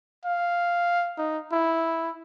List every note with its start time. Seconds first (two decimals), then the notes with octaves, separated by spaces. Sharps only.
0.25 F5
1.18 D#4
1.52 E4